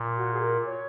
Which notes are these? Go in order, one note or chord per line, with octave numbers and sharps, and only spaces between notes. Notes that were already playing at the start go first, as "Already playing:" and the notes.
Already playing: A#2
F#4
G#4
A#4
C#5